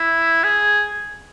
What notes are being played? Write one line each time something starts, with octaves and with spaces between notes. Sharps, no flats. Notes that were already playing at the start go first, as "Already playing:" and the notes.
Already playing: E4
G#4